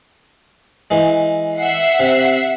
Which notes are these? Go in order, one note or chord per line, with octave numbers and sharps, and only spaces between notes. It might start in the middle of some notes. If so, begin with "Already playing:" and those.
E3 G#3
E5 F#5 C7
C3